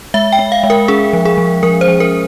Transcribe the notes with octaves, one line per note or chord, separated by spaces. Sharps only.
G#3 E5
G5
G#3
F5
G#3
A#4
C#4 G#4
F3
G#4
F3
F3 A#4
C5
F3
A#4